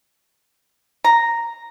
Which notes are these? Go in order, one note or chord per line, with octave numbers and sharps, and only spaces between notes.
A#5